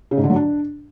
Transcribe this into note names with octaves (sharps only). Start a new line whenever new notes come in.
C#3
G#2
D3
F#3
D4